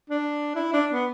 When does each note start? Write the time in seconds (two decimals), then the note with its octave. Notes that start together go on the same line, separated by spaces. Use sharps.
0.10 D4
0.55 E4
0.73 D4
0.93 B3